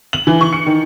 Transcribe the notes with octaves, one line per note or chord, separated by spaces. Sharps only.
F#7
E3
C#6
C#7
D#3